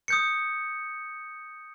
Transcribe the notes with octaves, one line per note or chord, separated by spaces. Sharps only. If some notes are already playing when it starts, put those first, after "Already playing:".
D#6 G6 C#7